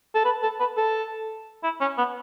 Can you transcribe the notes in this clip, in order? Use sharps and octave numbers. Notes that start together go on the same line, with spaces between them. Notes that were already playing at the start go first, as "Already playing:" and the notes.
A4
B4
A4
B4
A4
E4
C#4
B3